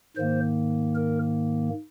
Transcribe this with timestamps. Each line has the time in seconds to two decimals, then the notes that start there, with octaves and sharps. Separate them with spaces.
0.17 G#2 D#3 A#3 C5
0.95 A#4